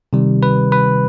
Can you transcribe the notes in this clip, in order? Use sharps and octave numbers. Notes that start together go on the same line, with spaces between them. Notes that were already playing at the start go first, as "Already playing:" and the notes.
C3 D#3 G3
B4
B4